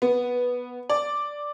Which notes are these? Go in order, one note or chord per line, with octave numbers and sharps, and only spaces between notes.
B3
D5